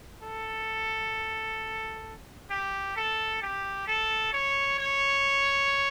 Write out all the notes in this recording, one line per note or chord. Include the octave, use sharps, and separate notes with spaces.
A4
G4
A4
G4
A4
C#5
C#5